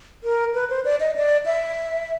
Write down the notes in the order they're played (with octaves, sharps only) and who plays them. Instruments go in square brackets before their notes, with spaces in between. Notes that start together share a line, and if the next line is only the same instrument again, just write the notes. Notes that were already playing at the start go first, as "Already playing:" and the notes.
[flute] A#4
B4
C5
D5
D#5
D5
E5